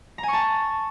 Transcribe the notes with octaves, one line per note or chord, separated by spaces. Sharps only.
A#5
G#5
C#6
A5